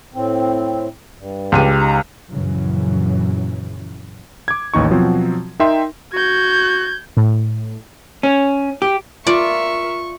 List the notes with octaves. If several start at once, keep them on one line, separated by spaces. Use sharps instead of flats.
A2 C4
G2
C#2 G4 D#7
D#4 A#5
A#1 F#2 C#3 E3 F#3
D6 G#6
A1 D#2 D#4 C#6
B2 F3 F#3 C4 F#4
D#4 A#4 E5 G5 C6
F#4 G6 G#6
A2
C#4
G4
F4 A#4 D5 E5 C#6